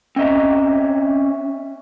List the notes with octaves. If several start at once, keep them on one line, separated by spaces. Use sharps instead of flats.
C4 C#4 D#5 E5 A#5